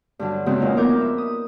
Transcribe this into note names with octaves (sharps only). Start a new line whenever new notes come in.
G2 D3 F#3
E2 C#3 E3 F#3 G#3 C4
F2 A#2 D#4
B3 A#4 D6 G6
E5
D#6